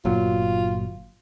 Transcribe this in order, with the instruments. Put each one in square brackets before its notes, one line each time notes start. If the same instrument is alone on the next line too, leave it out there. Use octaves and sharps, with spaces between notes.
[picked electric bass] G1 A#2 F#3 [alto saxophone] F4